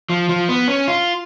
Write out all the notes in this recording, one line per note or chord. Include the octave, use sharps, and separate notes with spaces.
F3
F3
B3
C#4
F4